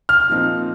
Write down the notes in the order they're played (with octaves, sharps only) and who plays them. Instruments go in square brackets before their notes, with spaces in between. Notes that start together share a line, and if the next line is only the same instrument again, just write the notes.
[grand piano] F6
[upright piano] A#2 F3 C4 D#4